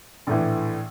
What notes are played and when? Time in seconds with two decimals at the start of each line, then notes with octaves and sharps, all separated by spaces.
0.27 A#1 A2 E3